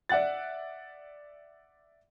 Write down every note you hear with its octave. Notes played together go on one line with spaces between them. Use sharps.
D5 E5 F#5 F#6 A6